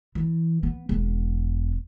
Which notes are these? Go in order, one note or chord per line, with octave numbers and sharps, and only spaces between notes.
E3
B3
E1 B3